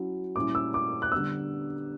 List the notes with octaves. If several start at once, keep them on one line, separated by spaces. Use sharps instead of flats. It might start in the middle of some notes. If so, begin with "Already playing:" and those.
Already playing: F#3 C#4 E4
A#2 G3 C#4 E4 D6
E6
D6
F#6
D3 G3 B3 E6